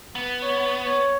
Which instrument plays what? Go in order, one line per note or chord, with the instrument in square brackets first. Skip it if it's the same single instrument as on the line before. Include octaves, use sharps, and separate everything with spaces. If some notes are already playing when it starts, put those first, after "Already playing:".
[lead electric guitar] B3
[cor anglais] C#5
C#5